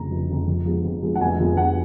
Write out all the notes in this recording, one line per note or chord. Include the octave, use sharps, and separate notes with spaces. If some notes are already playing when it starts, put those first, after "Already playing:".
Already playing: F1 F2 C#3 A#5
F1
F2 C#3
F2
F3 G#3 B3
F2
F3 G#3 B3
F#5
F1 G#5
F2 F3 G#3 B3
F1 F#5